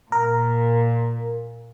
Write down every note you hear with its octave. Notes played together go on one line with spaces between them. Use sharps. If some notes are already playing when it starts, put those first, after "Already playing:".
A#2 A#4